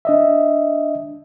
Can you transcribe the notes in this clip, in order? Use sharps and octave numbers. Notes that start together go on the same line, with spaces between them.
D4 D#5 E5